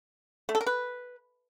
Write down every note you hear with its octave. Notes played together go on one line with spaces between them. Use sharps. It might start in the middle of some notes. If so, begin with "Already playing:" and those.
A3
A4
A#4
B4